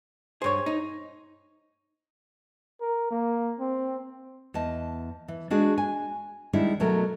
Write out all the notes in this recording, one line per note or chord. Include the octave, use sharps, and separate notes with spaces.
G2 G#4 C5 C#5
D#4
A#4
A#3
C4
E2 D#5 A5
E3
G#3 D4 F#4 G#4
G#5
D#3 G3 G#3 D4 E4
B2 F#3 A3 A#4